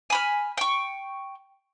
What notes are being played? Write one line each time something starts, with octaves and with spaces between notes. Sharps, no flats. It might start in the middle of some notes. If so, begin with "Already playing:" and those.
G#5 B5 F6
G5 C#6